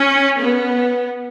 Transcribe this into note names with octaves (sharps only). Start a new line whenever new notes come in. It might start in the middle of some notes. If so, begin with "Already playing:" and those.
Already playing: C#4
B3